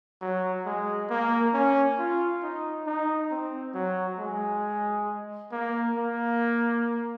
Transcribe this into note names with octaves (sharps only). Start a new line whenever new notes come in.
F#3
G#3
A#3
C#4
F4
D#4
D#4
C4
F#3
G#3
A#3
A#3